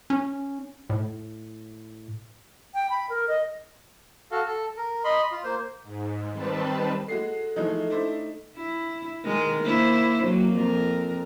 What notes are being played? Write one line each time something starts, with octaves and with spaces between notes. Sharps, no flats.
C#4
A2
G5
B5
A#4
D#5
F#4 A4 F5
A4
A#4
D#5 B5 C6
F4
A#3 C5
G#2
D#3 G3 C4 B4 A5
G#3 F#4 A4 C7
E3 F3 G#3 A3 D#4
D4 E4 C5
E4
D#3 G#3 A#4
A#3 E4 C5
F#3 A#3
F2 A#4